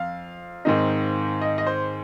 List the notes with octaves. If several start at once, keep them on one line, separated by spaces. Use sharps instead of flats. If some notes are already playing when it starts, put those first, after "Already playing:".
Already playing: F2 F5
G#2 D#3 C4 D#4
D#5
D#5
C5